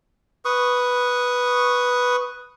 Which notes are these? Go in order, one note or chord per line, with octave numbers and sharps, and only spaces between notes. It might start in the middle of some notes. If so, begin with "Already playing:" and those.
B4 C#6 D#6